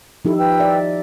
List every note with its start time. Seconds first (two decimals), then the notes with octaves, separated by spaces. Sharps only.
0.25 F3 D#4 E4 G4 A4
0.37 B4 G5 E6
0.60 D5 E5